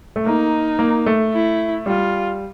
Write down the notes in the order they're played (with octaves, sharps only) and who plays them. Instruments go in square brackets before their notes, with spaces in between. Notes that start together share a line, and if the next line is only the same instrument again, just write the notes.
[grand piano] A3
[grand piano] A#3 [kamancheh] D#4
[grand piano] A#3
A3
[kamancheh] E4
[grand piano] G3 [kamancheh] F4